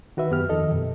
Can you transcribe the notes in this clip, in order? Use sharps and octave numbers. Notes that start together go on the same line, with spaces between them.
D#3 F#4 B4 E5
F#2 B3 G4 F6
F2 D#3 A4 D#5
F#2 B2